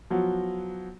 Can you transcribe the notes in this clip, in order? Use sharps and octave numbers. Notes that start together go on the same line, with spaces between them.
F3 F#3 B3 F#5